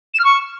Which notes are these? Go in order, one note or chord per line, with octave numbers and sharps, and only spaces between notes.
E7
F6
C#6